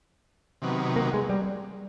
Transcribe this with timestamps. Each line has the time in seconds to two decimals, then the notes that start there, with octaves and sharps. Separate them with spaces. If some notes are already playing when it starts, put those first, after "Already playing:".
0.62 C3 D#3 F#3 B3
0.96 A#3
1.14 G#3
1.30 G3